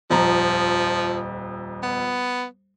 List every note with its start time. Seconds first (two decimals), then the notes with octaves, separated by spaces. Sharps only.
0.10 D#1 F2 F3 A#5
1.83 B3